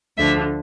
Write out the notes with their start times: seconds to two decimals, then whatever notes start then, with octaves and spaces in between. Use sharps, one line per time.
0.17 D2 D3 F3 E5